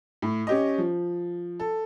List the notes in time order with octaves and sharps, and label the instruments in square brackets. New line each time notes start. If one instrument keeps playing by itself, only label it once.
[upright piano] A2
C#4 G4 D#5
F3
A4